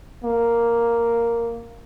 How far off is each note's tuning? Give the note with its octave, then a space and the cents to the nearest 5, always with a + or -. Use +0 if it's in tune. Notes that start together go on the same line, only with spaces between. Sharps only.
A#3 +0